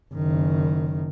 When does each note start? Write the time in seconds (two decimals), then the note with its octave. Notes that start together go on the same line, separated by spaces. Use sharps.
0.14 F#1 D#3